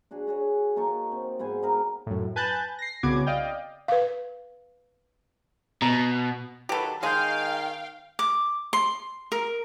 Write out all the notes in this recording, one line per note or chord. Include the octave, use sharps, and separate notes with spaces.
D4 F#4 G#4
F#4 G#4 C#5
A#3 D#4 A4 C#6
C4
G#2 B3 C5 G#5
D#4 A#4 F5
F#2 A2
B4 G#5 A5 F#6 G6 A6
A#6 C7
C2 C#3 B3 F#4 D6 G#6
D5 D#5 F5 G5
B4 F5
B2 B3 A#5
D#3 F#3 G4 A4 B4
D#3 G#3 G#4 F5 G5 G6 D#7
D6
C6
A#4